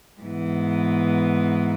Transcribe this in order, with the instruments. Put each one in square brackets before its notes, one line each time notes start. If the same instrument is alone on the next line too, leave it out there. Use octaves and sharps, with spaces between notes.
[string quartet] G#2 E3 B3